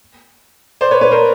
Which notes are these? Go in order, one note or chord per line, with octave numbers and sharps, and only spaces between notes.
C5 D5
B4 C#5
B4 C#5
A#4 C5